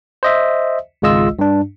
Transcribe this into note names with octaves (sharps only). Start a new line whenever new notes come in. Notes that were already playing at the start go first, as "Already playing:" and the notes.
C5 D#5 E5
G#1 C#2 G#3 F4 D#5 E6
G2 D4